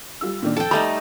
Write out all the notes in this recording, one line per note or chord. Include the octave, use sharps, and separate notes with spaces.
G3 F4 E6
A#2 D#3 D4
F2 A4 G5
G3 A3 D#4 A#5 D#6